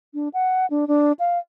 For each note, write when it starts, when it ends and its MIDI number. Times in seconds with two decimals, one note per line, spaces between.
0.14 0.28 62
0.34 0.66 78
0.70 0.87 62
0.88 1.12 62
1.19 1.38 77